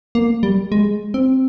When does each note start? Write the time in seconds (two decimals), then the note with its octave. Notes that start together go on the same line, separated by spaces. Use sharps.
0.15 A#3
0.43 G3
0.72 G#3
1.14 C4